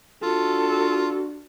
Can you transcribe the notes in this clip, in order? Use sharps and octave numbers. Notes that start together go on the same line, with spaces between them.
D4 F4 F#4 A4